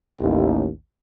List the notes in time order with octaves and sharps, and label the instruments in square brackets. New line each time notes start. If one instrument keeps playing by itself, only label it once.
[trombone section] A1 D#2